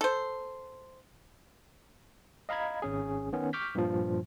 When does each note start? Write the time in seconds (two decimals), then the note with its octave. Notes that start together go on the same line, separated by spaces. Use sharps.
0.01 A4 C5
2.49 D#5 F5 A#5 B5 G#6
2.82 G#1 C#4 G#4
3.33 D#3 B3 C#4
3.53 C#6 D6 F6 G6 B6
3.75 G2 A#2 F3